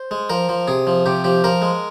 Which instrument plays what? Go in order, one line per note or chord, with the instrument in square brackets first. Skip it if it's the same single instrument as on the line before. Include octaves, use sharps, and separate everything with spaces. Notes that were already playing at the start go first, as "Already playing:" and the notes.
Already playing: [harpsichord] C5
G#3
F3 A#4
F3
C3 G#4
F3
C3 G4
F3 G4
F3 A#4
G#3